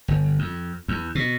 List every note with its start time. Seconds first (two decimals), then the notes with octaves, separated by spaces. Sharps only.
0.08 G1
0.39 F2
0.88 E2
1.15 B2